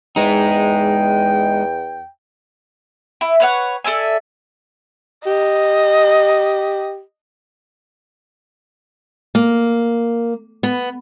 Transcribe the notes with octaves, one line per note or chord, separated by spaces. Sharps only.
E2 G#3 D#4 G5
E4
B4 C#5 F#5
A4 D5 E5 G#5
G4 D#5
A#3
B3